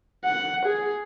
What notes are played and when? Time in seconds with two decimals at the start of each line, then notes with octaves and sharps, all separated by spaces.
0.25 F#5
0.65 G#4